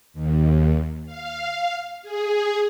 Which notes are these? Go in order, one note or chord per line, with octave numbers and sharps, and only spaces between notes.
D#2
F5
G#4